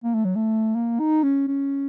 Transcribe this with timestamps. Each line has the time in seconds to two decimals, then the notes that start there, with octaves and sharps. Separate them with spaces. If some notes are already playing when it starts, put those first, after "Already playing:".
0.04 A#3
0.14 A3
0.25 F#3
0.35 A3
0.76 A#3
1.00 D#4
1.23 C#4
1.48 C#4